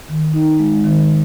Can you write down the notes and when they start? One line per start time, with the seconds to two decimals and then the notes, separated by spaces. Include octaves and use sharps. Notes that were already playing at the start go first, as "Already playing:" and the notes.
0.08 D#3
0.33 D#4
0.59 G#3
0.84 D#3